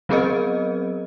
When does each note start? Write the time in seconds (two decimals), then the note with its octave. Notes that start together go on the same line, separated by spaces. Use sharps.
0.09 F#3 B3 C4 G#4 A#4 D#5